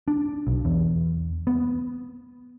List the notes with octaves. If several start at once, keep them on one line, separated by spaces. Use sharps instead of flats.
D4
B1
E2
B3